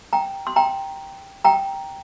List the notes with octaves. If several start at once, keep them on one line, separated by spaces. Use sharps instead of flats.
G5 A#5
C6
G5 A#5
G5 A#5